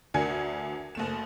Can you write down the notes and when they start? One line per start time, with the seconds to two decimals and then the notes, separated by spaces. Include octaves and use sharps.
0.14 D2 D4 A#4 G#5 G#6 C#7
0.95 F#1 A3 E7